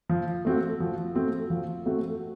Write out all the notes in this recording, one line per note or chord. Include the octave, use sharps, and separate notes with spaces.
F3
A3 C4 F#4
F3
A3 C4 F#4
F3
A3 C4 F#4